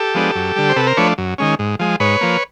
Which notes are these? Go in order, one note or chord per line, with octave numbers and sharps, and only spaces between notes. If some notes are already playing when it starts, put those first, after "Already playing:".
Already playing: G4 A4
F3 G#3 B3 D4
F#2
D3 G3
C5
C3 A4 B4
A#4 C5
F3 A3 D4 B4 C#5
F#2
D#3 G#3 C#4
G#2
F3 G#3
G#2 B4 C#5
F3 A#3